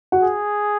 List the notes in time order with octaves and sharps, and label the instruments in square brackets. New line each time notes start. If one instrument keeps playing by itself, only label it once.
[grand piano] F#4 F#5
[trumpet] G#4